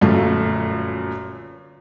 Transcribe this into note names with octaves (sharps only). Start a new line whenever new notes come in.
G1 F#2 A#2 A3 A5